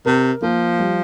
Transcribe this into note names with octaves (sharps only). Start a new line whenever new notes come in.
C3 A#4
F3 A#3
G3